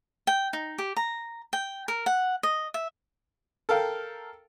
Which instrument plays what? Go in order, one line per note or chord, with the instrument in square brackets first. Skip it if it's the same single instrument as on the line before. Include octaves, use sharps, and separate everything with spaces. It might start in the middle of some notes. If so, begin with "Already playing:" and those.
[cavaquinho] G5
D#4
G4
A#5
G5
A#4
F#5
D#5
E5
[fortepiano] A4 A#4 F5 G5